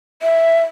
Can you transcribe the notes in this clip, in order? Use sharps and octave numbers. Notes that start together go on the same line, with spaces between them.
E5